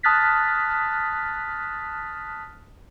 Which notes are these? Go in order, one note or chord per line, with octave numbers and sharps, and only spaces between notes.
A5 D#6 F6 F#6 A6 B6